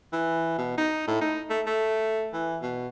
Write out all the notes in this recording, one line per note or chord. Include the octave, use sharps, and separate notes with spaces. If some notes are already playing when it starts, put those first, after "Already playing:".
E3
B2
D#4
A2
D#4
A3
A3
E3
B2